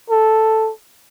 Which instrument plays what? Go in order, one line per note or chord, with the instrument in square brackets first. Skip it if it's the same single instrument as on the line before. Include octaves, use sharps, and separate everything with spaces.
[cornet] A4